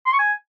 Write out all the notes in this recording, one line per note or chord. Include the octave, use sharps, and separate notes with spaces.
C6
C#6
G#5